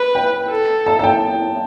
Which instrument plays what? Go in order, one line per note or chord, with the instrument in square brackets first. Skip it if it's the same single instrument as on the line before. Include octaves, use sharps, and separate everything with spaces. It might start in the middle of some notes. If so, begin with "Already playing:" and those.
Already playing: [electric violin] B4
[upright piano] G5
[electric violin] A4
[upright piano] A5
A5
G5